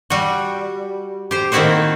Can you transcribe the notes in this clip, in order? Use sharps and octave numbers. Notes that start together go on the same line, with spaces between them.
G3 F#4
G4 C5
D#3 A#3 C4 E4 F#4 C5